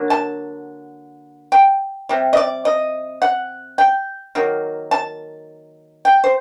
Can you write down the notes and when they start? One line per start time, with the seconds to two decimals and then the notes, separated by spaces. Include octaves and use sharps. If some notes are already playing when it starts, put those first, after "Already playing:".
Already playing: D3 F#3 A#3
0.10 A5
1.52 G5
2.09 C3 G3
2.33 D#5
2.37 D5
2.65 D#5
3.22 F#5
3.78 G5
4.35 D#3 F#3 A#3
4.91 A5
6.05 G5
6.24 C5